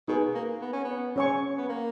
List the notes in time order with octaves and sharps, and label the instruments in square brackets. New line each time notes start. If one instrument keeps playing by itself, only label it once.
[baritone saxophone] B2 [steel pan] D#4 G#4 B4
[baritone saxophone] A#3
B3
C#4
B3
[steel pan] C#4 G#4 C#5 G#5 C#6
[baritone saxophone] B3
A#3